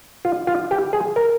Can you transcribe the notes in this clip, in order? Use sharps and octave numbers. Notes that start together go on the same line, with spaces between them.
F4
F4
G4
G#4
A#4